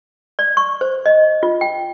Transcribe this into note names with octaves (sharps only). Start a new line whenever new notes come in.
D5
C#6
C5
D#5
F4
G5